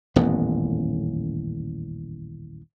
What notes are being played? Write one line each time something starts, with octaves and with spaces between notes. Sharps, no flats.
D#1 A1 F2 B3